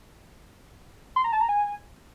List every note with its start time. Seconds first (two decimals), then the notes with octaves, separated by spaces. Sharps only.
1.16 C6
1.24 A#5
1.32 A5
1.40 A#5
1.49 G#5